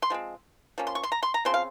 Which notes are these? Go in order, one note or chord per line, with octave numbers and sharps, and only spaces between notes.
C6
F3 G#3 C4
F3 A#3 C#4
C6
C#6
C6
A#5
C6
A#5
C#3 F3 C4 C6
F5